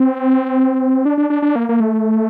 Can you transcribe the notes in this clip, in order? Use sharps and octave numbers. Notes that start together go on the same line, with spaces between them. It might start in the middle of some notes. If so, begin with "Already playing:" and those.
Already playing: C4
D4
D4
D4
D4
A#3
A#3
A3